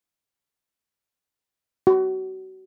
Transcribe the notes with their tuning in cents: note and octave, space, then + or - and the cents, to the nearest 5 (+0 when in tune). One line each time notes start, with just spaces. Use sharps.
F#4 +30